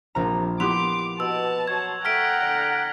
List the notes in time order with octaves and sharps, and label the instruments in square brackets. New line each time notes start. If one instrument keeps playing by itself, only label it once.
[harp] A#1 A#4 A#5 [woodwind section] C3
[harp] B3 E4 G4 [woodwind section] C6 [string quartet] D6 [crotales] F7
[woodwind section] B2 [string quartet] A5 [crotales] E6
[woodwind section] F#3 C6 C#6 [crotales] G#6
[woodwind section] A3 [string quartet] F#5 G5 A#5 [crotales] F6 B6 D7
[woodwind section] D3